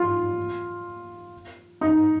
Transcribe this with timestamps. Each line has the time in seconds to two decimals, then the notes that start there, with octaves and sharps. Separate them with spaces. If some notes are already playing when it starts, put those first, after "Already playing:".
Already playing: F4
1.81 D#4